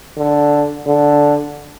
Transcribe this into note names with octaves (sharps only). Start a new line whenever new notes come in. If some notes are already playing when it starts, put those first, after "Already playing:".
D3
D3